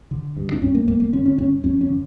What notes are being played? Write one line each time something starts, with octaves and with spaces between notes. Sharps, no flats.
D3
G2
D4
G2 C#4
A#3
G2 A#3
A#3
D3 C#4
C#4
G2 C#4
F2 C#4
C#4
D3